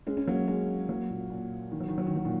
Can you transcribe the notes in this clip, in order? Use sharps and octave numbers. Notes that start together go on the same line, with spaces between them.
G#3 C#4
G#3 C#4
F#3 A#3
G#3 C#4
F#3 A#3
A#2
A#2
D#3
F#3
D#3
F#3
D#3
F#3
A#2 D#3